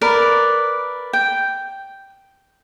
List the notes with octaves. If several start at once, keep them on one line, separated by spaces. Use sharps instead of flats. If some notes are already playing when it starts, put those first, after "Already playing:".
A#4 B4 D5
G5